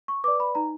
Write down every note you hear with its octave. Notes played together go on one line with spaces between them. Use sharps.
C#6
B4 D5 D6
B5
D#4 A#5